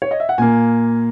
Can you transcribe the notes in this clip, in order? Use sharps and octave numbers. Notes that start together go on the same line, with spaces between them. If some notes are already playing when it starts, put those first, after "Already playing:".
C#5
D#5
E5
F#5
A#2 A#3 G#5